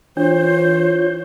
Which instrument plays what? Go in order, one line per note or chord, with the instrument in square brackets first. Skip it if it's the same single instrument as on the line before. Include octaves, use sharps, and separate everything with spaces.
[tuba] E3 [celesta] D4 [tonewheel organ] F4 C#5 G6 [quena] C5